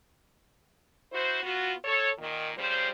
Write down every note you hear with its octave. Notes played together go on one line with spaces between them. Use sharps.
E4 F#4 C5
B3 F4 F#4
A4 C#5
A#2 D#3
F2 C#3 G3 C5